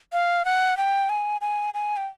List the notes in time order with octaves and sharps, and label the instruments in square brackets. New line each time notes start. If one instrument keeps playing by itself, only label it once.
[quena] F5
F#5
G5
G#5
G#5
G#5
G5